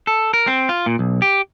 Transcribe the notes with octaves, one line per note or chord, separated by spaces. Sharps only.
A4
A#4
C4
F4
A#2
B1
G4